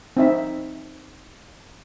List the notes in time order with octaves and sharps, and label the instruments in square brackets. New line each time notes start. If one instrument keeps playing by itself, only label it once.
[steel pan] C4 D#4 E5